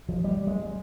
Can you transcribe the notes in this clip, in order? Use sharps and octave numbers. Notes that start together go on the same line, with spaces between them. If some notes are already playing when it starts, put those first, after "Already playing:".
F3
G3
G#3